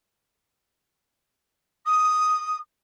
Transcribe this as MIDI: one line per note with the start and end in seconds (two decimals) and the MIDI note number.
1.86 2.57 87